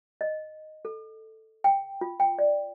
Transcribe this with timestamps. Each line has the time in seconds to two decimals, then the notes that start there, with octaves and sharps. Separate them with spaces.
0.21 D#5
0.85 A4
1.64 G5
2.01 F4
2.20 G5
2.39 D5